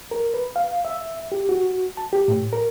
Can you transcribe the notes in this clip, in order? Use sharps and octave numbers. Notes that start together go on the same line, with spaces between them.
A#4
B4
F5
E5
G4
F#4
A5
G4
A2
A#4